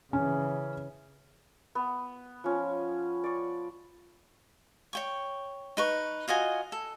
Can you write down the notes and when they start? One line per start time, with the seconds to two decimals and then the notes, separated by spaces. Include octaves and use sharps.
0.13 C#3 E3 C#4
1.75 B3
2.44 F3 C#4
3.24 D5 C#6
4.93 C#5 G5 C#6
5.77 D#4 B4 C#6
6.28 F4 F#4 D#5 G#5
6.72 A4